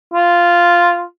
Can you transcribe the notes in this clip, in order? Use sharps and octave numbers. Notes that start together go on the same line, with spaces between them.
F4